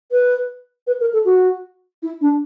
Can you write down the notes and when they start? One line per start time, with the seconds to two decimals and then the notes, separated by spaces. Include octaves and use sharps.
0.11 B4
0.86 B4
1.00 A#4
1.12 A4
1.24 F#4
2.02 E4
2.20 D4